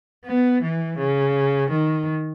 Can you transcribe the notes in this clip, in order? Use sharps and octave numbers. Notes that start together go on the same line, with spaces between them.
B3
E3
C#3
D#3